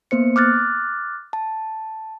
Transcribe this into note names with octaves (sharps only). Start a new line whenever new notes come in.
A#3 B3 C5 C#7
D6 F6 F#6 A6
A5